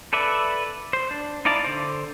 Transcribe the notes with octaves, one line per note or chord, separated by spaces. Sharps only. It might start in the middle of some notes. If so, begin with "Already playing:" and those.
A4 B4 D5 E5
C5
D4
D#4 E4 D5 F5 A5
D3 C5